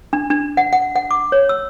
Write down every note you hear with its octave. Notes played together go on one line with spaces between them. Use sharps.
D4
D4
F#5
F#5
F#5
D6
C#5
E6